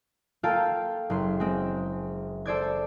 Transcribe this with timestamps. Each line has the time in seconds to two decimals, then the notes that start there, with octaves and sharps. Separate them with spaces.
0.43 A#3 F4 A4 F5 G5 A5
1.10 F#1 C6
1.40 G#3 C4
2.46 A4 C5 D5 G#6